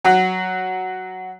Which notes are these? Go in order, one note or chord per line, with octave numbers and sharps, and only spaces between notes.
F#3 F#4